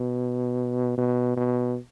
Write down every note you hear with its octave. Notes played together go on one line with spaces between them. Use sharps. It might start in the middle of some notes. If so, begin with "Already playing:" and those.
Already playing: B2
B2
B2